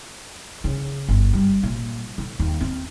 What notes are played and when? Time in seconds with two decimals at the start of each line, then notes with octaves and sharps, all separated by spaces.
0.64 C#3
1.08 G1
1.33 G3
1.63 A#2
2.18 D3
2.39 D#2
2.60 C4